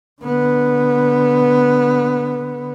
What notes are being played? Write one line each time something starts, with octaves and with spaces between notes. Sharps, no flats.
D3 B3